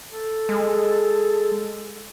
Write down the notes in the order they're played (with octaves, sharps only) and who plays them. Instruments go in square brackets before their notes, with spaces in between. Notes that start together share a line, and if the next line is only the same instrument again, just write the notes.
[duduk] A4
[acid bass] G#3